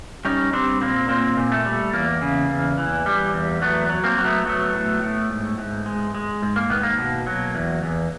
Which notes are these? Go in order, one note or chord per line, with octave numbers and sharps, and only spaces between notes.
G3 C#4 D#4
G3 C4 D4
A#2 A#3 C4
A#2 A#3 C4
A#2
A3
G3
E2 A#3
C#3
E2
E3
G3
E2
F#3 A3 B3
F#3
A#3 C4
F#3
A3 B3
F#3 A3 B3
A2
A2
G#2
G#2
G#3
G#3
G#2
A#3
D#3 B3
A#3
B2
F#3
E2
E2